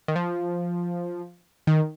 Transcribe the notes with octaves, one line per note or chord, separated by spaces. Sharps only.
D#3
F3
D#3